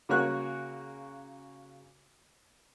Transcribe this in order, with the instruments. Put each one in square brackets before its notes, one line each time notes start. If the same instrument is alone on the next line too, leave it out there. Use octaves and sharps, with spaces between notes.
[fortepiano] C#3 A#3 F#4 C#5 C#6 F#6